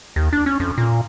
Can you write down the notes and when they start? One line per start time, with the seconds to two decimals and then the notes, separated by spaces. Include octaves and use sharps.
0.16 D#2
0.33 D4
0.46 C#4
0.60 F2
0.78 A#2